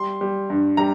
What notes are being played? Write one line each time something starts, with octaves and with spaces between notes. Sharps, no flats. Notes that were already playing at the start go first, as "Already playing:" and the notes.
Already playing: G3 C6
G3
G2
G3 A#5